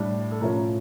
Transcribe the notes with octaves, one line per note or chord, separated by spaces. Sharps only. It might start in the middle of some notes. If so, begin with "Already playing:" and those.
Already playing: A2 G3 D4
A4
A2 F3 C#4 A#4